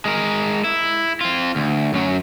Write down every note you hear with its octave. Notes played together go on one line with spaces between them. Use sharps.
G#3 A#4
E4
C4 F4
D2
F#2 F#3